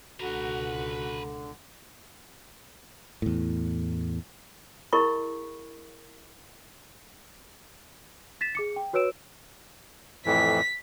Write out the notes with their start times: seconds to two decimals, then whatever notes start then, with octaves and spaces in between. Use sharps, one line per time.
0.20 C#2 B2 D3 F#4 B4 A#5
3.22 E2 A2
4.93 E4 G#4 A#4 D#5 B5 C#6
8.41 A6 B6 E7
8.55 G#4 D6 C#7
8.76 G5
8.93 F#4 B4 C#5 E6 D7 E7
10.26 F2 A2 E3 B6